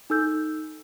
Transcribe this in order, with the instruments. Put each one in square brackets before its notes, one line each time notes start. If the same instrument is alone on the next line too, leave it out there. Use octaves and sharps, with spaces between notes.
[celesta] D#4 A4 E6 G6